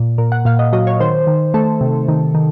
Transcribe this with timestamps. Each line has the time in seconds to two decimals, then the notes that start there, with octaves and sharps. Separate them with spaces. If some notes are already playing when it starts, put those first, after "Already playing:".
Already playing: A#2
0.18 A#2 A#4
0.32 F#5
0.45 A#2 F5
0.59 D#5
0.73 F#3 D#5
0.87 C#5
1.00 D#3 C5
1.27 D#3
1.54 A3 A4
1.81 C3
2.08 D#3
2.35 D#3